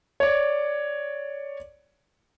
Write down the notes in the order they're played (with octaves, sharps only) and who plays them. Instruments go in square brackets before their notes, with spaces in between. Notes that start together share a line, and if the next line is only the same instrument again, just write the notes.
[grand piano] C#5 D5